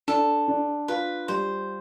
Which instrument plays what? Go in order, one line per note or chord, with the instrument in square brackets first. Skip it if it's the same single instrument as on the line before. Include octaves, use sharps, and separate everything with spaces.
[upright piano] D4 [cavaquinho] A4
[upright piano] D4
[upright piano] F4 [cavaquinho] B4
[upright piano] G3 [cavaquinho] C5